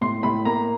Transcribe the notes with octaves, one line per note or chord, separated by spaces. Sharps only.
A2 C6
A2 B5
A#3 A#5